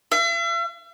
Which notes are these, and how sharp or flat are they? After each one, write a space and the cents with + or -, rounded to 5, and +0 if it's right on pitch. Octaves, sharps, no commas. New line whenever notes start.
E5 +45